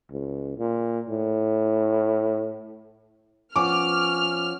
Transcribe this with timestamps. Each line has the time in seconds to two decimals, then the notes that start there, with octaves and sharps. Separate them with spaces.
0.11 C#2
0.58 A#2
1.09 A2
3.56 F3 B3 C#4 D6 F6